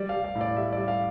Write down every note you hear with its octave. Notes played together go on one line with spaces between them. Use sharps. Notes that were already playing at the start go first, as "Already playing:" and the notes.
Already playing: G3 D5
F5
G3
F5
A2
D5
G3 E5
D5
G3
F5